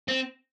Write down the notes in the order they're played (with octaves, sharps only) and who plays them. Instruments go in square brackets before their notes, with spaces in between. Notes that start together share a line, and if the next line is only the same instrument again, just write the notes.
[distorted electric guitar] C4